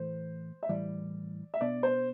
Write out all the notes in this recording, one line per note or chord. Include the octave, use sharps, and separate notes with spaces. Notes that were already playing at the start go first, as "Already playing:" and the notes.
Already playing: A2 E3 A3 C5
E5
A2 E3 G3 D5
E5
B2 B3 D4 D5
C5